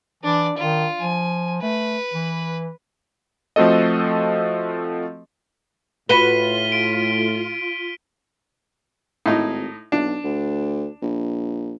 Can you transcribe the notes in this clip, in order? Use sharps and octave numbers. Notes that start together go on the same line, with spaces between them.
E3 D4 D5
D#3 F4
F3 G#5
A3 B4
E3
F3 A3 C4 F#4 A4 D#5
A2 F4 F#4 B4 B6 D#7 G7
D7
G#1 A2 D#4
B1 D4
D2
A#1